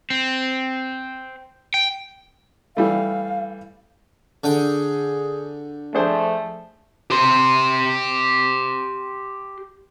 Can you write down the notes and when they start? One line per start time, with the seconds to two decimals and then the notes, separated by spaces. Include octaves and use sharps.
0.10 C4
1.74 G5
2.77 E3 G3 A3 F5
4.44 D3 G#4 G5
5.95 F3 A3 D4 G#4 C5
7.10 G4 C6